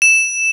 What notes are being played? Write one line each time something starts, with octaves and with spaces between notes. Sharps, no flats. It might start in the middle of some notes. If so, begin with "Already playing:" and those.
E7